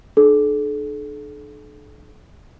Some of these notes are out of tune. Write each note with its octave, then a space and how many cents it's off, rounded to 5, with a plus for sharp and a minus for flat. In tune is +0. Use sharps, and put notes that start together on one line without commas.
D4 +40 A4 -40